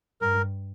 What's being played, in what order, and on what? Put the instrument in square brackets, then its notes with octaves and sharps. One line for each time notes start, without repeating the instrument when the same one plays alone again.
[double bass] G2 [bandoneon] A#4